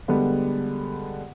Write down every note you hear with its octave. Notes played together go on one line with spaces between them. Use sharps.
D3 G3 G#3 B3